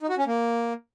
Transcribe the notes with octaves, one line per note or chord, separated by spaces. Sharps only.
D#4
F#4
C#4
A#3